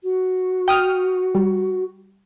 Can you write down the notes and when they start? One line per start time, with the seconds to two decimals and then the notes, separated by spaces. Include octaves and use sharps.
0.03 F#4
0.68 G5 D#6 F6
1.35 G3